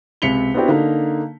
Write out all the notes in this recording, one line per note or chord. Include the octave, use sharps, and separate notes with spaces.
C#2 C3 B6 C#7 F7 G7
B3 C4 D4 E4 F#4 G4
D3 A#3 D#4